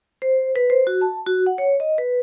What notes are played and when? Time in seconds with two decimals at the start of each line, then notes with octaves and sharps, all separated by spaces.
0.22 C5
0.56 B4
0.70 C5
0.87 F#4
1.01 A5
1.26 F#4
1.46 F#5
1.58 C#5
1.80 D#5
1.98 B4